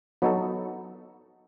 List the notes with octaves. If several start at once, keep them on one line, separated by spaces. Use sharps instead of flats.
F#3 B3 D#4 F#4 A4